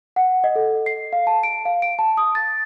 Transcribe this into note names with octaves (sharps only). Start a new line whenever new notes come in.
F#5
D#5
A4
C7
F5
A5
D7
F5
D7
A5
D#6
A6